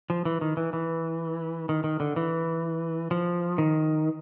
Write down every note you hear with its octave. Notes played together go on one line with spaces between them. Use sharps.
F3
E3
D#3
E3
E3
D#3
D#3
D3
E3
F3
D#3